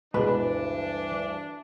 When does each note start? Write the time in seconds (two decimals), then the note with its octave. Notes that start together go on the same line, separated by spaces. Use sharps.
0.14 D2 G2 B2 E3 G#3 D4 B4